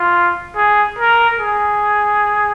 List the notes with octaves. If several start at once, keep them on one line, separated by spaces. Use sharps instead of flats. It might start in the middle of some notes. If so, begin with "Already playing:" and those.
Already playing: F4
G#4
A#4
G#4